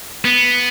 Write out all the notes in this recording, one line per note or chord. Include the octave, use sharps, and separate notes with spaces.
B3